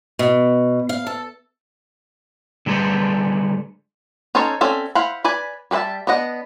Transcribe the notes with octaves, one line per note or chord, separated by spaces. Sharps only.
B2
F5
A4
D3 G3 G#3 A4 B4 C5
C#4 D#4 A4 C5 C#5
C4 C#4 A4 D5 E5
E4 C5 F5 F#5 B5
B4 D5 G#5 B5
G3 A4 B4 E5 A5
B3 D4 D#5 F#5